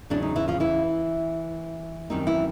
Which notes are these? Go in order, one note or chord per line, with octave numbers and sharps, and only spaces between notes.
E2 C#3 F#3 D4
D#4
E3 E4
F3 F4
E3 E4
F#2 D#3 G3 C4 D#4
E3 E4